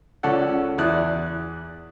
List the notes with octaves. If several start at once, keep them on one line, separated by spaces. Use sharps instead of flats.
C#2 C#4 A4 D5 F#5
E2 E4 D5 D#6 F#6